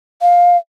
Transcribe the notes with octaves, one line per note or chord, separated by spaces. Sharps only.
F5